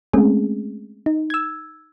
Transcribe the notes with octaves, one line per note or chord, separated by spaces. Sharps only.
G#3 A3 C4 C#4 G#4
D#4
E6 G#6